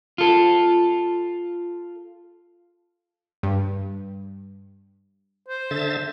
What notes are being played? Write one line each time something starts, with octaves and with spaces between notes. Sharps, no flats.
F4 A4
G2
C5
D3 E5 A6